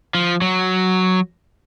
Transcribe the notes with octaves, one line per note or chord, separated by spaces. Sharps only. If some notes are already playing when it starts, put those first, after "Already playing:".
F3
F#3